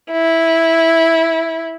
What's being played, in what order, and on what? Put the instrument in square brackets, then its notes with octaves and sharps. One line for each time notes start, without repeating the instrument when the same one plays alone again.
[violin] E4